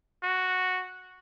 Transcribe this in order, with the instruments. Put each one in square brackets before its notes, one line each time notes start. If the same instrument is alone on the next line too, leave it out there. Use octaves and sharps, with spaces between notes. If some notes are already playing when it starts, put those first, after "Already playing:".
[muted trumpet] F#4